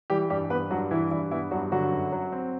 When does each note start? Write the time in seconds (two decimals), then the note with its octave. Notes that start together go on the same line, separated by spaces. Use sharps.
0.10 E3 G3 G4
0.30 G2 G3 G4
0.50 B3 B4
0.70 G2 F#3 F#4
0.91 E3 E4
1.11 G2 E3 E4
1.31 E3 B3 E4
1.51 G2 F#3 F#4
1.72 D3 F#3 F#4
1.92 F#2
2.12 F#3
2.32 C4